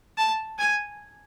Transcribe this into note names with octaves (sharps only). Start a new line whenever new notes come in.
A5
G#5